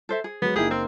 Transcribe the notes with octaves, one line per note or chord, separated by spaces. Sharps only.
A4 C5 E5
G#4
F#3 G#3 B3
F#1 A#3 D#4 E4 G4 G#4
C4 A#4 C5